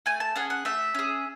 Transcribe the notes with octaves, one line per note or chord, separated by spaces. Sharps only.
A3 G#5
A5
C#4 G#4 F#5
F#5
A3 E5
C#4 G#4